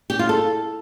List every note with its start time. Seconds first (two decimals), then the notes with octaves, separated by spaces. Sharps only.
0.10 G4
0.19 F4
0.29 A4